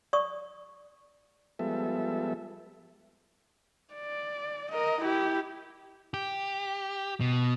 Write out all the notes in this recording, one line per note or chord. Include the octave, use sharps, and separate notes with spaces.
D5 C#6 D#6
F3 G3 G#3 B3 A4 E5
D5
A#4 D#5
E4 G4
G4
B2